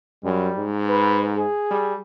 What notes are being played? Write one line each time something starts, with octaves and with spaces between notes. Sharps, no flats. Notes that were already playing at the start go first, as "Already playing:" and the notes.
F#2 G3
G#2
B4
G#4
G3